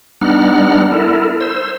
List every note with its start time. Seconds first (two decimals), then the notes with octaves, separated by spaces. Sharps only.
0.21 G3 B3 D4 D#4 F#5 F6
0.92 E4 A4 A#4
1.40 C5 E6